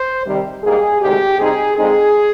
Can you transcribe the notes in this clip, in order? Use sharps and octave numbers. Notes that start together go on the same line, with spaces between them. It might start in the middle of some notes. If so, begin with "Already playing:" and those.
Already playing: C5
C3 D#3 G3
G#2 G3 A#3 D#4 G#4
D2 C3 D#3 G#3 G4
C3 G3 C4 D#4 G#4
F2 D3 G#3 C4 D#4 G#4